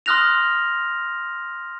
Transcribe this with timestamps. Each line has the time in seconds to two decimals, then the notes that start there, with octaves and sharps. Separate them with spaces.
0.06 C6 D#6 F6 F#6 A#6 F7